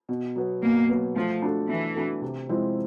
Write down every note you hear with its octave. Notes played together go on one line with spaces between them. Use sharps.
B2
F#3 B3
B2 A#3
F#3 B3
F3 A3
D4 F#4 A4
E3 A3
D4 F#4 A4
C3
F3 G#3 C4 E4